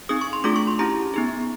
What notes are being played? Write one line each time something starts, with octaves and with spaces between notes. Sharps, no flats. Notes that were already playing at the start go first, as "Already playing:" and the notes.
C4 D#4 G#4 D#6
C#6
C6
A3 D4 F4 G#4 D6
C#6
C6
C#4 E4 G4 A#5
B3 D#4 G#4